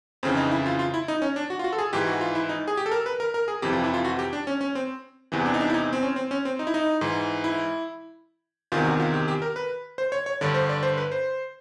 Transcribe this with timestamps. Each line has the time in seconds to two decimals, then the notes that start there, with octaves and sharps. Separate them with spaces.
0.23 F2 C#3 E3 C4
0.37 D#4
0.51 E4
0.66 F4
0.79 F4
0.94 E4
1.08 D#4
1.22 C#4
1.36 D4
1.50 F#4
1.59 F4
1.64 F#4
1.72 A4
1.78 G#4
1.93 G#2 E3 G4
2.06 F#4
2.21 F4
2.35 E4
2.49 D#4
2.68 G#4
2.77 G4
2.86 A4
2.92 A#4
3.06 B4
3.20 A#4
3.34 A#4
3.48 G#4
3.62 F2 C3 E3 G4
3.73 F4
3.84 E4
3.94 F4
4.05 F#4
4.19 G4
4.33 D4
4.47 C#4
4.61 C#4
4.75 C4
5.32 E2 C3 E3
5.46 D4
5.54 D#4
5.60 D4
5.70 E4
5.74 D#4
5.93 C4
6.03 C#4
6.16 C4
6.31 C#4
6.45 C4
6.59 D#4
6.67 E4
6.74 D#4
7.01 G#2 E3
7.44 E4
8.72 E2 C3 D#3 F4
8.85 F#4
9.00 F4
9.14 G4
9.28 G4
9.42 A#4
9.56 B4
9.98 C5
10.12 C#5
10.26 C#5
10.41 G2 D3 D5
10.54 C5
10.69 D5
10.83 C5
10.98 B4
11.12 C5